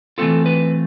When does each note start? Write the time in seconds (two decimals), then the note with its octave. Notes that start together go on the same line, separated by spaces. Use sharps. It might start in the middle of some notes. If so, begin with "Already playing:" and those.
0.18 E3 A3 C4 F4 A4
0.46 B4